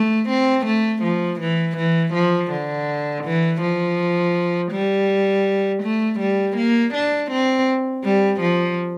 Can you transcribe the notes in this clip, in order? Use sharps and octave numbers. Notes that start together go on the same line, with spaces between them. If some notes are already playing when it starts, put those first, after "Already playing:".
Already playing: A3
C4
A3
F3
E3
E3
F3
D3
E3
F3
G3
A3
G3
A#3
D4
C4
G3
F3